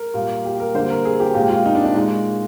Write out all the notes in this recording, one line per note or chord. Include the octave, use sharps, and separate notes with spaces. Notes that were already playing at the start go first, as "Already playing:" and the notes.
Already playing: A#4
A#2 G3 A#3
G4
A#4
D3 G3 A#3 C5
A#4
G#4
G4
A#2 G#3 G4
F4
D#4
D4
D4
A#2 G#3 D#4